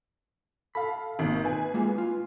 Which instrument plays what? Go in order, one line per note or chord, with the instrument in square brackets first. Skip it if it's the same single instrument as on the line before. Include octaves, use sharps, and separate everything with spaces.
[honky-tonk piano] A4 F5 [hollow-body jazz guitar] B5
[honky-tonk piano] G#1 A#3
B4 G#5
[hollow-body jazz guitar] G#3 A#3 F4
F4